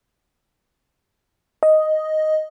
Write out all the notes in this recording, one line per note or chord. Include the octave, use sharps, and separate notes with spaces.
D#5